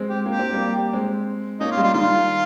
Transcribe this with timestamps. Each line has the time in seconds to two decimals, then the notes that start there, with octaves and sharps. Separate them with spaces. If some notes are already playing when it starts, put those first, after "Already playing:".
Already playing: G#3 C4
0.09 G4
0.26 A#3 G4
0.39 C4
0.53 G3 A#3
0.93 G#3 C4
1.60 A#3 C#4 D#4
1.71 F4
1.77 G3 A#3
1.83 F4
1.93 D#3 G3 F4